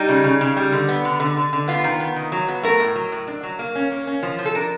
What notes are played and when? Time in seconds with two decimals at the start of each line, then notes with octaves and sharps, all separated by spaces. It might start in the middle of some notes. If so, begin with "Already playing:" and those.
Already playing: G3 D#4
0.09 C#3
0.24 C#3
0.41 C#3
0.57 G3
0.72 D3
0.88 B3
1.05 D3
1.20 D3
1.37 D3
1.53 D3
1.68 B3 F4
1.84 D#3
2.00 B3
2.16 D#3
2.32 F#3
2.48 B3
2.63 A3 A#4
2.80 A2
2.95 F#3
3.12 A2
3.28 D4
3.43 F#3
3.59 A#3
3.75 C#4
3.92 A#3
4.07 C#4
4.23 F3
4.39 F3
4.46 A4
4.55 D4 A#4